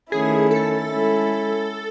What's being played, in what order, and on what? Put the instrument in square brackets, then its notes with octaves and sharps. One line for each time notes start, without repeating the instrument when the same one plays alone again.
[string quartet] D#3 A3 C#4 E4 [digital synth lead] G#4
[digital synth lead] A4
[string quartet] G#3 C#4 E4